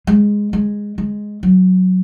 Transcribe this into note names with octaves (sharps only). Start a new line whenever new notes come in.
G#3
G#3
G#3
F#3